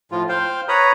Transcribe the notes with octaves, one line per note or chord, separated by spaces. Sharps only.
A2 F3 F4
C5 F5 G5
B4 C#5 A#5 B5 D#6